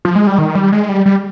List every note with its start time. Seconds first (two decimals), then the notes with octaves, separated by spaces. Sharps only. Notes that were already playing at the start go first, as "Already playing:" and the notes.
0.05 F3
0.16 G#3
0.27 G3
0.39 D#3
0.55 G3
0.72 G#3
0.89 G3
1.06 G3